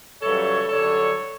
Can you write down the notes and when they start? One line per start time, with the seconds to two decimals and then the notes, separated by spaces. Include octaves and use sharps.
0.22 F#2 C#3 E3 G3 A4 C#5
0.69 F#2 D3 G3 A4 C#5